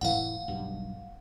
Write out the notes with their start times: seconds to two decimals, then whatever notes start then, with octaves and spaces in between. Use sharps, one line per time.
0.01 F1 A2 E3 F5 F#5
0.48 B1 G2